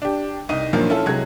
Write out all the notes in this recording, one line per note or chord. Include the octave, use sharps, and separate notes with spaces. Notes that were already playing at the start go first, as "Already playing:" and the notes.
D4 G4
C2 D#4 D#5 D#7
G2 A#2 D#3 F3 F#3 A#3
C#4 E4 F4 A4
C3 F#3 G#3 F#6 G#6